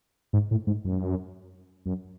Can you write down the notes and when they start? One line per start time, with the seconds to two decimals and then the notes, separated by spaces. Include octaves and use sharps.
0.33 G#2
0.51 A2
0.67 G#2
0.85 F#2
1.86 F#2